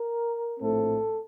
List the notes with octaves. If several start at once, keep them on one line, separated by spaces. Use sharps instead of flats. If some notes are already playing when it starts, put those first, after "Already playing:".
Already playing: A#4
A#1 A2 A3 C4 A4